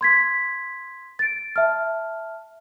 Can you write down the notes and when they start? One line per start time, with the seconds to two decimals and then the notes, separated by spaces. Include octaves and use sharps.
0.01 C6 G#6 B6
1.19 A6 D7
1.56 E5 A5 F6